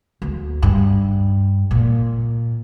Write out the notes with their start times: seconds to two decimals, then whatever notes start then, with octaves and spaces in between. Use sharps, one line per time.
0.22 D2
0.62 G2
1.71 A#2